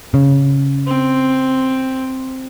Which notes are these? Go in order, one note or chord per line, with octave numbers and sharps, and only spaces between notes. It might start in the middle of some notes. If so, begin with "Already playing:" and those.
C#3
C4